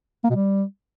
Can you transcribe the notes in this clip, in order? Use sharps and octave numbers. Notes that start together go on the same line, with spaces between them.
A#3
B2
G3